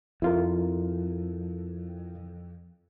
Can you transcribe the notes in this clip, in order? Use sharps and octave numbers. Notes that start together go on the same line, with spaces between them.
F2 E4 F4 A#4